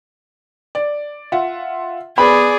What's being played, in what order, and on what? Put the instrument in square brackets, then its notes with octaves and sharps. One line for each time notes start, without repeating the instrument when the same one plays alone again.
[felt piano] D5
F4 E5 F#5
[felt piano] B3 B4 G#5 [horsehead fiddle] G#4 D5 [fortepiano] B5